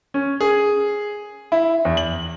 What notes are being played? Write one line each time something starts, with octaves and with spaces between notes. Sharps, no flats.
C#4
G#4
E4
E2
F#7